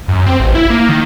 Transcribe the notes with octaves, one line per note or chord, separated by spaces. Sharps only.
F#2
C4
A1
E4
A#3
D#3